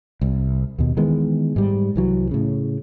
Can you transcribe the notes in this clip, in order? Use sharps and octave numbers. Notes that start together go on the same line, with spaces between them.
C2
D#2 B2
D#3 E3 G#3 B3
G#2 G3
C2 E3 F#3
A2 C#3